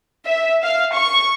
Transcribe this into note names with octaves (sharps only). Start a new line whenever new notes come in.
E5
F5
C#6